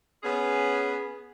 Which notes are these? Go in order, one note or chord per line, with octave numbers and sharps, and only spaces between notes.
B3 C#4 G#4